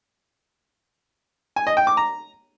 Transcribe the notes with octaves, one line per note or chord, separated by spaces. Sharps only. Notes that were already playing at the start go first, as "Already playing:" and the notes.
G#5
D#5
G5
D6
A#5